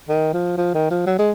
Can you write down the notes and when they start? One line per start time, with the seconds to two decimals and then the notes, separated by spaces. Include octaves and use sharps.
0.09 D#3
0.33 F3
0.58 F3
0.74 D#3
0.90 F3
1.06 F#3
1.19 G#3